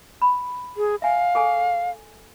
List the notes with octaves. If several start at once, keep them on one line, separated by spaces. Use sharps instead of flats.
B5
G#4
E5 F5 G#5
G#4 A4 G#5